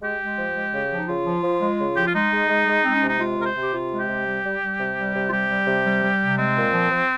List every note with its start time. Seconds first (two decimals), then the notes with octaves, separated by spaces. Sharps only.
0.01 G#3 G4
0.19 G#3
0.37 F3
0.55 G#3
0.72 C#3
0.90 F3
0.98 D#4
1.08 C#3 F4
1.25 F3
1.43 F3
1.61 G#3
1.78 C#3
1.96 F3 G4
2.05 F4
2.13 G#3 D#4
2.31 G#3
2.49 G#3
2.67 G#3
2.83 G#3 C4
2.95 C#4
3.02 C3 D#4
3.20 G#3 F4
3.38 C3 A#4
3.46 C5
3.55 C3
3.62 G4
3.73 C3 F4
3.91 G#3
4.00 G4
4.08 C3
4.25 G3
4.44 G3
4.61 G3
4.79 C3
4.97 G3
5.15 C3
5.28 F4
5.31 G3 G4
5.49 G3
5.67 C3
5.85 G3
6.02 G3
6.21 C3
6.38 G#3 C4
6.56 A#2
6.74 F3
6.91 F3